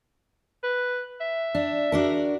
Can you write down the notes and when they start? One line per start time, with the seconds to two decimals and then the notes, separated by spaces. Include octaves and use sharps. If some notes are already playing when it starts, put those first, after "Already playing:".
0.63 B4
1.20 E5
1.55 D4
1.92 D4 F#4 A#4